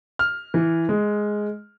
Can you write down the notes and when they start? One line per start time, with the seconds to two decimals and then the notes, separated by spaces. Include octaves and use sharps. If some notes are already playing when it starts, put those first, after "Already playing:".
0.19 F6
0.54 E3
0.89 G#3